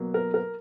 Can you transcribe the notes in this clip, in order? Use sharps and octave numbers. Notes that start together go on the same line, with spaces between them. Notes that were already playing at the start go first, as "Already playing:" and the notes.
Already playing: B2 F#3 A#3
A#4
A#4